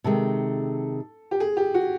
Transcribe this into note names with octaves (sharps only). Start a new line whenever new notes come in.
C3 D#3 G#3 A4
G4
G#4
G4
F#4